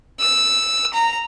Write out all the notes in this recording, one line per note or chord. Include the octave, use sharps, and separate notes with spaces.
E6
A#5